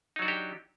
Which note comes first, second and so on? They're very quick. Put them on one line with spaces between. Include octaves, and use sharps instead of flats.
D#4 F#3 F#4 D4 G4